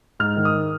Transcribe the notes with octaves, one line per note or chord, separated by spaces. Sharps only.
G#2 F6
D#3
D#6